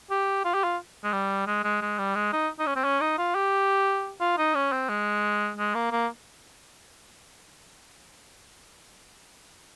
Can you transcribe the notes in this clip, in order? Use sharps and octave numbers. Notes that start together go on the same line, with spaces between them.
G4
F4
G4
F4
G#3
G3
G#3
G#3
G#3
G3
G#3
D#4
D#4
C#4
C4
C#4
D#4
F4
G4
F4
D#4
C#4
C4
G#3
G#3
A#3
A#3